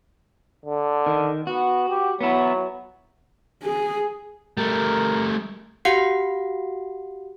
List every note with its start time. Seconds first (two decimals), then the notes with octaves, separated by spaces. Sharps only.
0.66 D3
1.06 D#3
1.47 B3 F#4
1.89 G4
2.21 F#3 B3 E4
3.63 G#4
4.57 G3 A3 A#4
5.85 F#4 G4 F5 F#5 C7